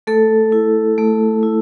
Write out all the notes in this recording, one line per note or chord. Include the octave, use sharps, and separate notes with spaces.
A3 A4
E4
A3
E4